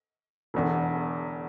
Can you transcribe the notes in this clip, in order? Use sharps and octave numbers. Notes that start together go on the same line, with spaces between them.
E1 E2 D3